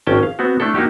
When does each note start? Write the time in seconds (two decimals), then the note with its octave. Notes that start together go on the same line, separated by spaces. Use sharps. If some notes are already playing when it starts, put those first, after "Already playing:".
0.07 G#1 C#4 G5 A5
0.23 F5
0.39 B3 C4 F#4
0.60 A3 D4 E4 A4
0.75 A#3 D#4 F#4 G4